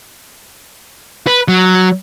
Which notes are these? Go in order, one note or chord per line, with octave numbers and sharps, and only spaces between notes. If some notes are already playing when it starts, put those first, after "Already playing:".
B4
F#3